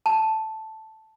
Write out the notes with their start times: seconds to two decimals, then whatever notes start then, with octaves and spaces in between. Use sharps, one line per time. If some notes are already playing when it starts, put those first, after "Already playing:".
0.06 A5